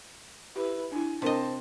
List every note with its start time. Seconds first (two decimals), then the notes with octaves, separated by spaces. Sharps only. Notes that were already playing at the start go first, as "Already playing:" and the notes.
0.56 E4 G4 B4
0.92 D4 E4 G#5
1.22 C3 D4 A#4 C5 D#5 A5